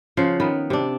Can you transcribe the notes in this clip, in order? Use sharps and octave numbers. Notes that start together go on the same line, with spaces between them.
C#3 F3 C5 F#5
D#3 B3
C3 D4